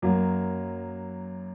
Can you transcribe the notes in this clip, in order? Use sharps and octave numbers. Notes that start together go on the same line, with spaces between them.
F#2 F#3 A#3